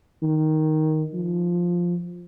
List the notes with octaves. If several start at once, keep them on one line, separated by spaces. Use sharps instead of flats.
D#3
F3